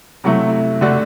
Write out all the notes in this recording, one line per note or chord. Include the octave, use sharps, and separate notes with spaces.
C3 F#3 A3 E4
D3 A3 D4 F#4